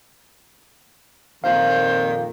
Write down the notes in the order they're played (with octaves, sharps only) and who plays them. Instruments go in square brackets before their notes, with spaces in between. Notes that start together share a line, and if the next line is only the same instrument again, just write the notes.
[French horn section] F2 A#2 [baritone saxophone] D#3 [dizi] C5 [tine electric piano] F5